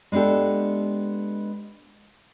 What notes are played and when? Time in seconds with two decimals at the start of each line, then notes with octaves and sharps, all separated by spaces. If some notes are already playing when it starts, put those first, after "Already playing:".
0.12 G#3 B3 D4 G4 A4